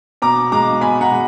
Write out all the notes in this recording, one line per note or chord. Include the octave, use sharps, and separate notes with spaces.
B2 A#5 D6
G#3 A#5 D6
B2 G#5 B5
F#5 A#5
G#3